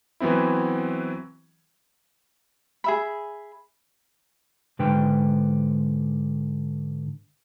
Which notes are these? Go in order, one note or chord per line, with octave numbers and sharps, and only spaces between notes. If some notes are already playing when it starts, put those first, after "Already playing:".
E3 F#3 B3 C4 E4
G#4 E5 B5
G#2 D3 B4 G5